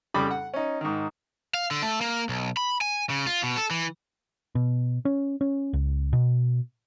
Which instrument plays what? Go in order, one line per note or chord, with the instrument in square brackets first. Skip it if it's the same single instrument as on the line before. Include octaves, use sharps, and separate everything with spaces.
[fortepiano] F2 C#3 G3 B5 D6
F#5
C#4 D#4
G#2 D#3
[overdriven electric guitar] F5
D3
A3
A#3
B1
B5
G#5
C#3
F4
B2
A4
E3
[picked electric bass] B2
C#4
C#4
C#2
B2